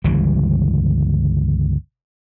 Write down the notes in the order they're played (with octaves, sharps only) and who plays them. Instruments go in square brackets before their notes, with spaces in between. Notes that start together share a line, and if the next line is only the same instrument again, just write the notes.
[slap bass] G1 C#2 E3 G3